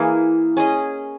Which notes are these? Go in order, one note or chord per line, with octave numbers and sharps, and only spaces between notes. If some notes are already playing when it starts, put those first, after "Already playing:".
Already playing: E3 A#3 E4 G#4
C#4 G#4 D#5